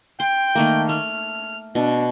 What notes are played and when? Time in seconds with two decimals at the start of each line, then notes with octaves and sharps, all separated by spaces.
0.20 G5 C6
0.55 D#3 A3 A#3
0.89 A3 F6
1.75 B2 D4